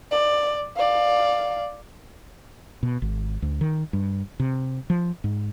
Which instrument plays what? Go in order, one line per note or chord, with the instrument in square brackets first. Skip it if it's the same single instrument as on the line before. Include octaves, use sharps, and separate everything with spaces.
[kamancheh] D5
D5 F5
[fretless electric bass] B2
G#1
D2
D#3
G2
C3
F3
G#2